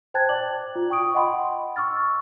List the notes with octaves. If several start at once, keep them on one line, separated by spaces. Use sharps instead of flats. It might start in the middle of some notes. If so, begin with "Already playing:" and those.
C5 G5 A5 F#6 G#6 A6
D5 D6 F#7
F4
G5 C#6 D#6 D7
D#5 F#5 G5 B5 C6
C#6 D6 E6 F6 A6